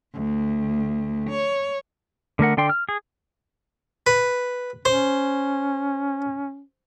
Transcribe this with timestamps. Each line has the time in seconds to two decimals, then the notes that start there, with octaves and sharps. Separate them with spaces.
0.14 D2
1.30 C#5
2.39 D3 A3 A#4 F#5
2.57 D3 D4 G5 C6
2.69 F6
2.89 G#4
4.07 B4
4.85 C#4 C5